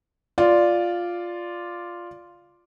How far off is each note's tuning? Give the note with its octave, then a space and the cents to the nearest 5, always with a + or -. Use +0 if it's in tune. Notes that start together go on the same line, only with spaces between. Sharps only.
F4 +0 D5 +0